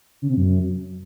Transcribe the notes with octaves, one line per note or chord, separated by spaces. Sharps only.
C#3
C3
F#2